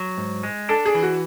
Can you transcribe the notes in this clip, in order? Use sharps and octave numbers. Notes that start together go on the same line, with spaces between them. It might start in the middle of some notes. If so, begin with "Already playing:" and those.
Already playing: F#3
G#2
G#3
D4 A4
G#4
E3
F#4